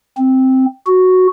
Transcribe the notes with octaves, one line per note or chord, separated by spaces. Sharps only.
C4
F#4